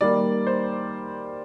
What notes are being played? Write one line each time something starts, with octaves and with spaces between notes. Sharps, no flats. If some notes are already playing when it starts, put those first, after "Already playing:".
D#3 G3 A#3 D5
C5